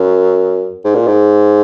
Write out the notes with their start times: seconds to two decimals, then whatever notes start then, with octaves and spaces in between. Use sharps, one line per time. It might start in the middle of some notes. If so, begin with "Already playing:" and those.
Already playing: F#2
0.85 G#2
0.95 A#2
1.07 G#2